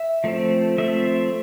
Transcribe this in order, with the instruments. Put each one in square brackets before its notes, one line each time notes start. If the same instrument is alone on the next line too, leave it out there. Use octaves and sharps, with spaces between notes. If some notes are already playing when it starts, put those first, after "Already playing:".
Already playing: [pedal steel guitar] E5
F3 A3 C4
F3 A3 C4 E5